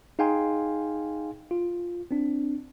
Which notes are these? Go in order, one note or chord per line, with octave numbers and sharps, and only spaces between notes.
D#4 G#4 F5 G5 G#5 C6
F4
C4 D4